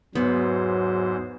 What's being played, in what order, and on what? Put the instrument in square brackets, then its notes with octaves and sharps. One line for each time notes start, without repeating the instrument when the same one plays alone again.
[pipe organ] E2 G#2 C5 [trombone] F#3 [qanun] B3